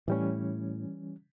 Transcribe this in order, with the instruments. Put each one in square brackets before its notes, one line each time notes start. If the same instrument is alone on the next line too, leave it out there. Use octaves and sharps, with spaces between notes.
[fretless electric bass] A2 [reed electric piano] E3 G3 C#4